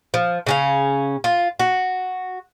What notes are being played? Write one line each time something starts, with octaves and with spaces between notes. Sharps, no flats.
F3
C#3 C#4 F5
F4
F#4